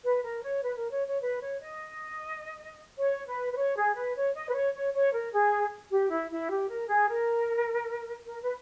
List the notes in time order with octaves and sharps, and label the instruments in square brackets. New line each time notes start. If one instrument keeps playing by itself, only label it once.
[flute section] B4
A#4
C#5
B4
A#4
C#5
C#5
B4
C#5
D#5
C#5
B4
B4
C#5
G#4
B4
C#5
D#5
B4
C#5
C#5
C#5
A#4
G#4
G4
E4
E4
G4
A#4
G#4
A#4
A#4
B4